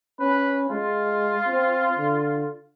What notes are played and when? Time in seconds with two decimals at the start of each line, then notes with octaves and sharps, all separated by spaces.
0.20 C#4 B4
0.70 G#3 F4
1.48 C4
1.97 D3